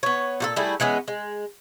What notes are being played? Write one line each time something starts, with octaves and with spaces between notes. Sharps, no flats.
B3 C#5
A#2 F#4 A4
G3 A3 E4 G#4
E3 G#3 B3 C#4
G#3